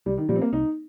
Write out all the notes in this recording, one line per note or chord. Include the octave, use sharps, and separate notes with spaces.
C2 G3
D#3
A#2 F3 G3
C4
A#3
C2 D#4